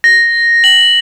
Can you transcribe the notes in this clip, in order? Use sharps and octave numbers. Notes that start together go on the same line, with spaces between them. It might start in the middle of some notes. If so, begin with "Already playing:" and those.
A#6
F#7